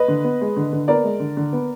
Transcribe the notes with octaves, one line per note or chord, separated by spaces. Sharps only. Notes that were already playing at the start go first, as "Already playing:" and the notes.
Already playing: B4 D#5
D3
B3
G#3
D3
D3
B3 A#4 D5
G#3
D3
D3
B3